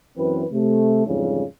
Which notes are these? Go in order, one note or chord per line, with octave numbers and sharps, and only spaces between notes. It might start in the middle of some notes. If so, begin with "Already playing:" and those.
F#2 E3 C4 B4
C3 A3
F2 G#2 C#3 E3 G3